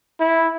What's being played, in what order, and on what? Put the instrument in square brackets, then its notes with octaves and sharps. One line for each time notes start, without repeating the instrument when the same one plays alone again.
[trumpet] E4